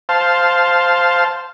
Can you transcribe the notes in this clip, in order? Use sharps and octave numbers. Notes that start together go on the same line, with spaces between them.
C5 F5 A5